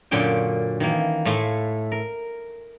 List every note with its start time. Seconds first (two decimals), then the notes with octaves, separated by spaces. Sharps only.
0.11 F#2 A#2 D3 C#4 G5
0.80 D#3 E3 A#3
1.25 A2 A3 F5 G#5 C6
1.92 A#4